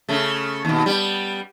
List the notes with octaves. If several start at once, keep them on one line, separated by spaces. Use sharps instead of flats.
C#3 A3
D#2 B2
G3 B3